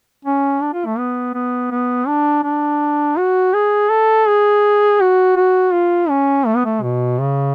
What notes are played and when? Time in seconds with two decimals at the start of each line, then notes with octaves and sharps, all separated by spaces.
0.25 C#4
0.61 D4
0.73 F4
0.86 A3
0.98 B3
1.34 B3
1.71 B3
2.07 D4
2.44 D4
3.18 F#4
3.54 G#4
3.90 A4
4.27 G#4
5.01 F#4
5.36 F#4
5.73 F4
6.09 C#4
6.46 A3
6.56 B3
6.65 A3
6.82 B2
7.19 C#3